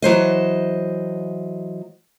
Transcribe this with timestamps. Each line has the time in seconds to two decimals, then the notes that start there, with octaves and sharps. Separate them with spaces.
0.02 E3 F#3 C5 D#5